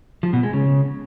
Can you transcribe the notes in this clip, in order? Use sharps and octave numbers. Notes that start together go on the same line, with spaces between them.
F3
B2
G#3
C#3